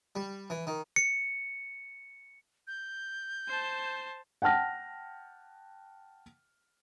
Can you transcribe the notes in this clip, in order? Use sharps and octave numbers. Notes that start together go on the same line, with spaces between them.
G3
E3
D#3
C#7
G6
C5 A5
F#5 G5 A5 F6 A#6